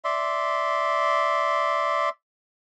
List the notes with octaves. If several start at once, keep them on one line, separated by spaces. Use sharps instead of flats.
D5 E5 C6